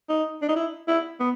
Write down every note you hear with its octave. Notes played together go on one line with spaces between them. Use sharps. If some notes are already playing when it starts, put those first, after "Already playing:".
D#4
D4
D#4
E4
E4
B3